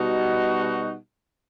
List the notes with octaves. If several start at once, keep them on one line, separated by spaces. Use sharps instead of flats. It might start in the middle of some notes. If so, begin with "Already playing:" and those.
Already playing: B2 G3 D#4 F#4